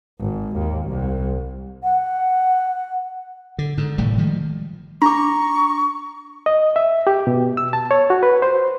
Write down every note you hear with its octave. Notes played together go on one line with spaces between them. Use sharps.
G#1
D#2
C2
F#5
D3
G#2 D3
G#1 A2 C3 G3
D#3 F3 G3 G#3
D4 A#5 C#6 D6
D#5
E5
G4
B2
E6
A5
C#5
F#4
B4
C5